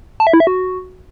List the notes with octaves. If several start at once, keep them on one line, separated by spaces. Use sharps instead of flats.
A5
E5
E4
E5
F#4